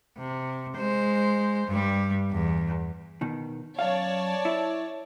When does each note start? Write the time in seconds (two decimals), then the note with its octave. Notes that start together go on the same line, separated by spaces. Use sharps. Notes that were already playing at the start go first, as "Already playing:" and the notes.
0.18 C3
0.77 G#3 C5
1.67 G2 G3
2.31 E2
3.21 B2 D#3
3.79 F#2 C#5 D5 F5 A5
4.45 E4